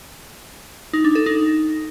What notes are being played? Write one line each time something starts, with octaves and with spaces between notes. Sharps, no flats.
D#4
D4
A4
D#4